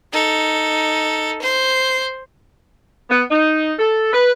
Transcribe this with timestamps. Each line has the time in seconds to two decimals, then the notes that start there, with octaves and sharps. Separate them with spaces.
0.13 D#4 A4
1.42 C5
3.10 B3
3.30 D#4
3.79 A4
4.13 B4